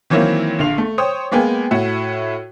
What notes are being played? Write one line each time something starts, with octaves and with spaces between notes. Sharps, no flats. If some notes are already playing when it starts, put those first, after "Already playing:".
D#3 E3 F#3 A#3 C4 E4
A#1 D3 F5 F7
A3
C5 C#5 G5 D#6
G#3 A#3 B3 G5 G#5
A2 E4 F#4